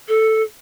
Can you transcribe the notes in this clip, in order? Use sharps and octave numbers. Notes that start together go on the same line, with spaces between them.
A4